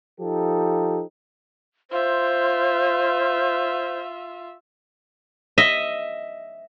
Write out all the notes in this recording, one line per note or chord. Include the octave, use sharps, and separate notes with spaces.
F3 D#4 G4 A4
F4 C5 E5
D#5 E5